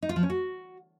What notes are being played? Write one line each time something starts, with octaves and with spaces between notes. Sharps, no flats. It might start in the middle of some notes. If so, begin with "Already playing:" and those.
D#4
F4
F3
C#4
F#4